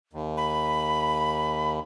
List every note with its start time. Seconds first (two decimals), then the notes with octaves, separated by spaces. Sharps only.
0.13 D#2
0.37 B5